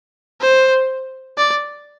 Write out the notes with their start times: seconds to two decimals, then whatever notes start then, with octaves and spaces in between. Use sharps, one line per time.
0.41 C5
1.37 D5